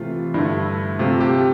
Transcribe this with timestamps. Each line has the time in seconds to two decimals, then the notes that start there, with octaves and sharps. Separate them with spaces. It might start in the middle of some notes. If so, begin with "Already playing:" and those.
Already playing: C3 E3 A3 F4
0.34 G2 D3 A3 E4
0.99 C3 F3 A3 F4
1.20 G4